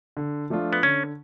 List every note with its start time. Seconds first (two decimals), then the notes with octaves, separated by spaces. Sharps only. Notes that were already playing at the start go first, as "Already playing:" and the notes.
0.17 D3
0.50 F3 A3 D4 F4
0.73 B3
0.83 D3 C#4